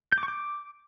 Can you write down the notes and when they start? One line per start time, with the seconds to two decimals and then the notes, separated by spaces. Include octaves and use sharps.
0.12 G6
0.18 D6
0.23 C#6
0.28 D6